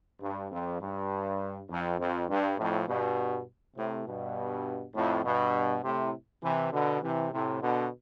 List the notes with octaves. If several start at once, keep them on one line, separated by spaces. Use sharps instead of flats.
G2
F2
G2
F2
F2
G2
F2 A2
G2 B2
A2 C3
G2 B2
F2 A2
G2 B2
A2 C3
C3 E3
B2 D3
C3 E3
A2 C3
B2 D3